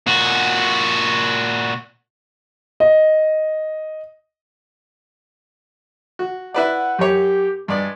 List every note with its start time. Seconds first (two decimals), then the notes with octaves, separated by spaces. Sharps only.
0.07 A#2 F#4
2.80 D#5
6.19 F#4
6.54 E4 B4 D5 F#5
6.99 F#2 G4 C#5
7.68 G2 G3 G#3 D5